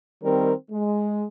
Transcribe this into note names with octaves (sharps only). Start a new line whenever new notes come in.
D#3 G3 C4 A#4
G#3